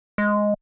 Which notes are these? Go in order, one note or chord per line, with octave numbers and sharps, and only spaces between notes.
G#3